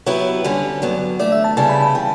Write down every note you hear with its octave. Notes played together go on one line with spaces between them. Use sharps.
F#3 B3 E4 G4 B4 C#5
D3 G3 C#4
G2 F#3 B3
E2 D3 A3 D5
E5
A5
C#3 G3 B3 E4 A5
B5
A5
C#3 E3 G5